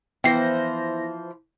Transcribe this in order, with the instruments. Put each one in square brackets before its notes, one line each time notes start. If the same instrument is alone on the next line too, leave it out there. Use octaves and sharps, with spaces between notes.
[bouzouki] E3 F3 C5 [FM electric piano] B3 E4 A#6 [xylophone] G5 C7